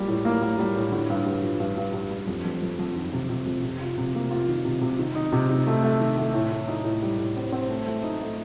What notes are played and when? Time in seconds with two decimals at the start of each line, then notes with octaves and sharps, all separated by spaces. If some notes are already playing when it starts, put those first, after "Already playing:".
Already playing: G3 A#3 F4
0.08 A2
0.25 A#3
0.42 A#3
0.59 G3
0.76 A2
0.92 D3
1.10 G2
1.26 G2
1.43 F3
1.60 G2
1.78 G2
1.94 G2
2.11 G2
2.27 F2
2.45 F2
2.62 F2
2.79 F2
2.96 D#3
3.13 C3
3.30 C3
3.46 F2
3.63 C3
3.81 F4
3.98 C3
4.15 A#3
4.31 F4
4.48 D#3
4.65 C3
4.81 C3
4.99 D#3
5.15 D#4
5.32 C3
5.50 D#4
5.67 A3
5.83 A3
6.00 D#3
6.18 A3
6.34 A2
6.52 A2
6.68 D#4
6.85 A2
7.02 G3
7.18 A2
7.36 C4
7.52 C4
7.69 A3
7.86 A3
8.03 D#4
8.20 A3